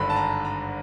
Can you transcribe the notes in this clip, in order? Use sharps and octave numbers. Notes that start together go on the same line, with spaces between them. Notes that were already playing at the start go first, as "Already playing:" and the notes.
Already playing: G#1 G2 D3 B5
A5
A#5
A#5